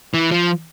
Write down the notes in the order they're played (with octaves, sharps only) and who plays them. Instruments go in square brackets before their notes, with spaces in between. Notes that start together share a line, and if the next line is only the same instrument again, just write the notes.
[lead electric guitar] E3
F3